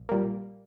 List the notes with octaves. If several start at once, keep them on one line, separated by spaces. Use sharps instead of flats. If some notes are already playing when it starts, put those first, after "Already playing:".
Already playing: A#1
A#2 G3 A#3